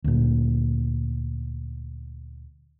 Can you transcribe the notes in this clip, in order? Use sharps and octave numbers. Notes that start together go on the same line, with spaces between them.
D2 A#2